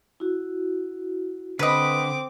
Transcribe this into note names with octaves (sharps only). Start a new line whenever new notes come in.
E4 F#4
D3 C4 B4 D#5 D6